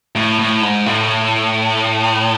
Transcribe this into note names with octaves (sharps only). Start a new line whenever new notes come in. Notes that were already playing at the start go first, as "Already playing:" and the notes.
A2
A2
G#2
A2